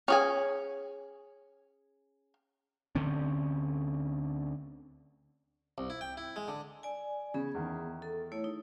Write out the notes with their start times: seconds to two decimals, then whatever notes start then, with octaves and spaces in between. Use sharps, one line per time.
0.08 C#4 G#4 G#5
2.95 D2 D3 C4 C#4
5.78 C2
5.90 E4
6.01 G5
6.17 E4
6.36 G#3
6.48 D3
6.83 D5 G#5
7.34 C#3 B3 G#4
7.55 E2 D#3
8.02 A4
8.32 A3 E4 C#5
8.44 D#4